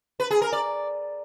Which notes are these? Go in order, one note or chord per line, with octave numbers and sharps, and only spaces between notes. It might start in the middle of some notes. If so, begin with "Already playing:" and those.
B4
G#4
A#4
D5